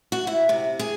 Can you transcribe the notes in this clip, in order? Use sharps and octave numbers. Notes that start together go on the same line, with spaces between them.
F#4
E4
C3
G#4